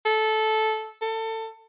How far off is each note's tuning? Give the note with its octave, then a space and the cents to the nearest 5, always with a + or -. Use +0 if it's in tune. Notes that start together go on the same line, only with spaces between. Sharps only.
A4 -15
A4 +25